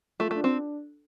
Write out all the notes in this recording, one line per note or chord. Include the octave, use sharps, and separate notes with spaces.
A3 F4
A3 D4
C4